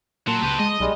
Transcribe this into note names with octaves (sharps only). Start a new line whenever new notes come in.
A#2 F#3 A5 C6
C#2 G4 B4
G#3 D#5
B1 G3 G#3